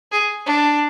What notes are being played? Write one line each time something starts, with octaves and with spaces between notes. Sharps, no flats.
G#4
D4